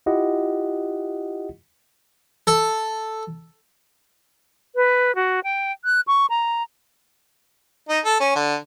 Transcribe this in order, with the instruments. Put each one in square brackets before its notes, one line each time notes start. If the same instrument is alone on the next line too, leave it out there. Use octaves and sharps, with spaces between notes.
[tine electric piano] E4 F4 G4 D#5 F#5
[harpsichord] A4
[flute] B4
F#4
G5
F#6
C#6
A#5
[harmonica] D#4
A4
C#4
D3